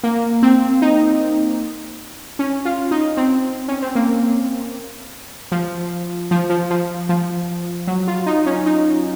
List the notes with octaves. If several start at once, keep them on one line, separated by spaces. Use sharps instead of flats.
A#3
C4
D#4
C#4
F4
D#4
C4
C#4
C4
A#3
F3
F3
F3
F3
F3
F#3
F4
D#4
C#4
D#4